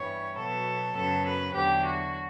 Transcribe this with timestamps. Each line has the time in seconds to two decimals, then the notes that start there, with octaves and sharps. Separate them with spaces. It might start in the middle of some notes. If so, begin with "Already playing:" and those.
Already playing: G2 E3 G3 B3 C#5
0.37 B2 F#3 B3 A4
0.96 F#2 C#3 F#3 B3 A4
1.26 B4
1.54 E2 D3 F#3 G4
1.84 F#4